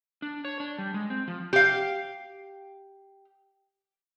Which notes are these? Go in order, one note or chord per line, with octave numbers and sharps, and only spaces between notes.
D4
C#5
D4
G3
G#3
C4
F3
G4 F5